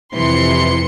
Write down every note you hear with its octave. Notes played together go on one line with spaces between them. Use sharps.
F2 C3 E3 C6 C#7